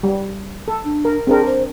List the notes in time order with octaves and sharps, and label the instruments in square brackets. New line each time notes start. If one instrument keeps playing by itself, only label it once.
[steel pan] G3
A4
[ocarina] D4
[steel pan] A#4
[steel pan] C4 D4 A#4 [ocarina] G#4
[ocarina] C5